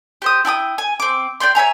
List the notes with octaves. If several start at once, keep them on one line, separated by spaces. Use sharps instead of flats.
G4 C5 D#6
E4 G5 A5 D#6
G#5
C4 D6
G4 D5 G5 C6
C#5 E5 G#5 A#5